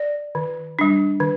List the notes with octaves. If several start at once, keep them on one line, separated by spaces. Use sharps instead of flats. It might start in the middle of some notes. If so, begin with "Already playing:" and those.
Already playing: D5
D#3
G3 D4
D#3